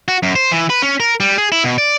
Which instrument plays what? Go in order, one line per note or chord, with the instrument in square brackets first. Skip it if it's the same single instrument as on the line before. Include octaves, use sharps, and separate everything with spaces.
[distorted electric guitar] F#4
F#2
C5
E3
B4
C#4
A#4
G3
G#4
E4
B2
D5